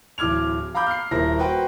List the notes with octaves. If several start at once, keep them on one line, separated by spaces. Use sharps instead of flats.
D1 E3 D6 F6 G#6 F7
F5 A#5 B5 D6 G6
F6 C7
D#1 E4 A#4 C5 A#6
F#4 B4 C5 G5